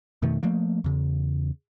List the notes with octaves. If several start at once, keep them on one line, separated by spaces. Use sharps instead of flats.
F2 B2 D#3 A3
F3 A3 A#3
E2 C#3